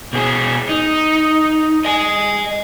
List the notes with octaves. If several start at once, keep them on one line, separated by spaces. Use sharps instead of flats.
B2 G#4
D#4
D#5 G#5